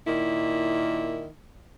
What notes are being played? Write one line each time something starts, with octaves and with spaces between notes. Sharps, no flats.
A#2 D#3 E4